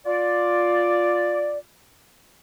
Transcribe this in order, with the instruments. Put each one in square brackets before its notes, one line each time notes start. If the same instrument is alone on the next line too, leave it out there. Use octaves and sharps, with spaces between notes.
[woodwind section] F4 D5